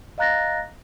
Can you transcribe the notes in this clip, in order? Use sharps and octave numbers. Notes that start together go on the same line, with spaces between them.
D#5 F5 A#5 F#6 A6 A#6